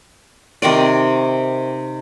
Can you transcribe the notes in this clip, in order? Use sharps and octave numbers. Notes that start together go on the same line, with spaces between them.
C3 D#3 C5 D5